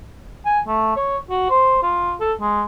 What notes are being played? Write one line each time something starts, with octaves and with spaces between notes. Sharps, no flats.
G#5
A3
C#5
F#4
C5
F4
A4
G#3